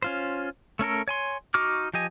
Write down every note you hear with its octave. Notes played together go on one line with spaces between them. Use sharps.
C#4 F4 C5
A3 C#4 A4 A#4
C#5 G#5 C6
D#4 F#4 C#6 D6 F6
F3 G4 D#5 G#5